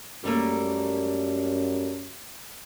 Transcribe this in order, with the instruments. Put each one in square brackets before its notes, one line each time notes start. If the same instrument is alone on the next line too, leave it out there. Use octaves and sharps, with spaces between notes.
[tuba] F#2 [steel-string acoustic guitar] G3 A3 A#3